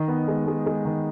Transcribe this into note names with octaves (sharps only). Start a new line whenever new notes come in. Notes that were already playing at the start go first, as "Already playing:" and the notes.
Already playing: D#3 D#5
B3
G#3
G#3
G#3
D#3